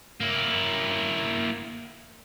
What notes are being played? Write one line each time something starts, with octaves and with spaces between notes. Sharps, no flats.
A#3 E4